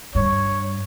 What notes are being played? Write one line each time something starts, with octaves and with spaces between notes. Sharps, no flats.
G2 C#5